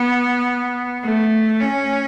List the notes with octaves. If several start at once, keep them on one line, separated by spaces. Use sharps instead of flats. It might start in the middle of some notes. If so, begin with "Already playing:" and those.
Already playing: B3
A3
C#4